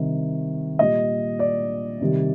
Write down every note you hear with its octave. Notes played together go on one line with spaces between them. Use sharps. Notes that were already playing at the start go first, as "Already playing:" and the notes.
Already playing: C3 D#3 G3
A#2 G3 D#5
D5
C3 D#3 G3